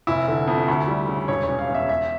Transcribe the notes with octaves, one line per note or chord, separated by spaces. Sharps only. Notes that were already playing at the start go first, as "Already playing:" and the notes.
F1 E4
D3
F2
D2
G3
C#3
E1 C#5
C#5
C#3
F5
E2
E5
E2 E5